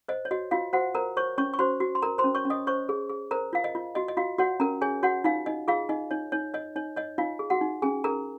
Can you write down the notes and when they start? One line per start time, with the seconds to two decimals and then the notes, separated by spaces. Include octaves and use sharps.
0.08 C5 D#5
0.25 C#5
0.31 F#4 D#5
0.51 F4 F#4 F5
0.73 F#4 C5 F#5
0.95 A#4 C5 A#5
1.17 C5 C#5 C#6
1.38 C#4 C#5 C#6
1.54 C#6
1.59 F#4 C5 C6
1.80 F#4
1.95 C6
2.02 A#4 A#5
2.18 C5 C6
2.24 C#4
2.35 C#5 C#6
2.45 C#4
2.50 D#5 D#6
2.67 C5 C#5 C#6
2.89 G#4
3.09 G#4
3.31 A#4 C5 A#5
3.53 F4 F5
3.64 D#5
3.75 F4
3.95 F#4 D#5
4.08 D#5
4.17 F4 F#4 F5
4.38 F#4 C#5 F#5
4.60 C#4 A#4 A#5
4.81 G#4 C#5 G#5
5.03 F#4 C#5 F#5
5.24 D#4 F4 F5
5.46 D#4 D#5
5.68 F4 G#4 F5
5.89 D#4 D#5
6.11 D#4 C#5
6.32 D#4 C#5
6.54 C#5 D#5
6.76 D#4 C#5
6.96 C#5 D#5
7.18 D#4 F4 F5
7.39 G#4
7.50 F#4 F#5
7.61 D#4
7.82 C#4 G#4 G#5
8.04 G#4 A#4 A#5